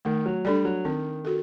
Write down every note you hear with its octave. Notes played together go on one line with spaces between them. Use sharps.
D#3 A3
F#3
G3 D4 A4 D5
F#3
D#3 C4
F#4 A4